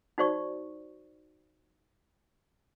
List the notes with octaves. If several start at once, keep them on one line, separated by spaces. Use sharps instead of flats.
D#4 F#4 C5 D5 C#6